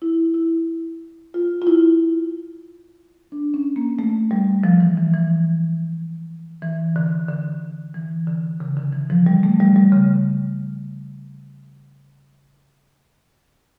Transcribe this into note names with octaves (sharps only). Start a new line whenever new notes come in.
E4
E4
F4
F4
E4
D4
C#4
A#3
A3
G3
F3
E3
E3
E3
E3
D3
D3
E3
D3
C#3
D3
E3
F3
G3
A3
G3
G3
C#3